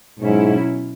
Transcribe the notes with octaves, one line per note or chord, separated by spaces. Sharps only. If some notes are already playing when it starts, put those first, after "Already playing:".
G#2 B2 F#3 C#4 E4